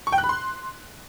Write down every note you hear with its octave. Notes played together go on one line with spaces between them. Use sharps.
C#6
G5
F#6
B5
C6